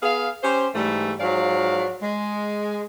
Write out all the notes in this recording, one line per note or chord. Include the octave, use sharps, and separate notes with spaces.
B3 G#4 F5
C#4 G4 C5
G#2 E3 G3 A3
G#2 F3 F#3 D5 F5
G#3